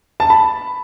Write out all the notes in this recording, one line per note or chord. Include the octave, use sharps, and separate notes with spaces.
A5
B5